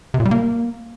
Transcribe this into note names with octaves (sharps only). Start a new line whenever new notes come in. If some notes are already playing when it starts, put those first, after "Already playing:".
C3
A#2
G3
A#3